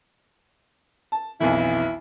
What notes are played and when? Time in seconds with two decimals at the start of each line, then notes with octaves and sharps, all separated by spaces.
1.12 A5
1.40 B1 F2 E3 E4